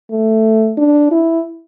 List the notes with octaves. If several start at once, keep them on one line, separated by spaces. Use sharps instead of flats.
A3
D4
E4